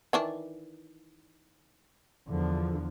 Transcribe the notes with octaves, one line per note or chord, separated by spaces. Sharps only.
D#3 E3 D4
E2 D3 F3